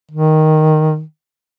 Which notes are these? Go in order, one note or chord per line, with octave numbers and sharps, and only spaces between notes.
D#3